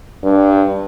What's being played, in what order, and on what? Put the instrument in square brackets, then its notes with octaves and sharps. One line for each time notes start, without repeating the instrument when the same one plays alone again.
[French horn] G2